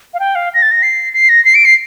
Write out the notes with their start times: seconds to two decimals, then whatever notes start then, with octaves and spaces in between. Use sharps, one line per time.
0.14 F5
0.20 G5
0.35 F5
0.54 A#6
0.62 A6
0.71 A#6
0.83 C7
1.13 C7
1.29 A#6
1.45 C7
1.55 D7
1.65 C7